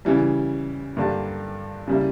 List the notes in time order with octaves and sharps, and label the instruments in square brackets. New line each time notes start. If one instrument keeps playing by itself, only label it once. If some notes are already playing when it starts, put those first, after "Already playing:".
[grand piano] C#3 E3 G3
G2 D3 A#3 D4 G4
C#3 G3 A#3 E4